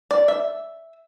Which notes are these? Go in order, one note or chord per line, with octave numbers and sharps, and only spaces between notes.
D5
E5